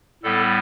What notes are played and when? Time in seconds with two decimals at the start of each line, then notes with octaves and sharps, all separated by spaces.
0.23 A2 G3 B3 A4